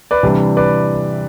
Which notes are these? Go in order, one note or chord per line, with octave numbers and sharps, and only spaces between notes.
B4 D5
C3 E3 G3 D4
B4 D5